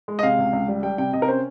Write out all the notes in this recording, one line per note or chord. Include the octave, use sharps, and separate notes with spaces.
G#3
D#5
C3 F5
C#2
C#2
G3
G3 G5
C3 G5
C3 D#5
A#4
C#4 C5